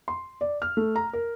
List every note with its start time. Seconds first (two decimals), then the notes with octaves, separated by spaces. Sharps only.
0.08 C6
0.41 D5
0.62 F6
0.77 A3
0.96 A#5
1.13 A#4